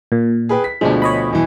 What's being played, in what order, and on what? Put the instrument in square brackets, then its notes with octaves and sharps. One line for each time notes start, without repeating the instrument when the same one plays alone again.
[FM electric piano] A#2
[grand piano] G#4 B4 G5
B6
[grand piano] D2 B2 F3 [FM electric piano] G#3 D4
[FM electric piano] C#5 D#5 B5
[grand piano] E2 B2 E3